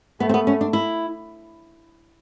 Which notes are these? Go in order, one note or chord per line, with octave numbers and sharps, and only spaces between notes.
A3 B3
C4
B3
C#4
D4
E4